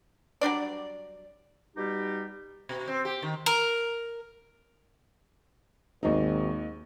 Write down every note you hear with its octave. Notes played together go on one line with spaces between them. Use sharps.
F#3 G3 D4 D5
B2 G3 D#4 G4
B2
C4
G4
D#3
A#4
G#1 D#2 D#4